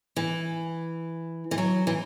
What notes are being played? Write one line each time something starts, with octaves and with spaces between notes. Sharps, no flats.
E3
E3
F#3
E3